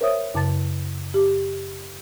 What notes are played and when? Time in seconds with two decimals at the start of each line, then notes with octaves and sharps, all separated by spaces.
0.01 A#4 C5 C#5 E5 D#6
0.34 F#2 C#3 A5 A6
1.14 G4